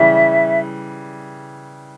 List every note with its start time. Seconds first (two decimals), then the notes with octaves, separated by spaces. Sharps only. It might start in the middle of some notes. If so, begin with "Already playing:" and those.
Already playing: C#3 E3 G3 E5